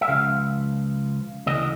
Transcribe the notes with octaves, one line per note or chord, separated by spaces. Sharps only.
E5
C#2 C#3 F3 G#3 F5
D2 C#3 E3 D#5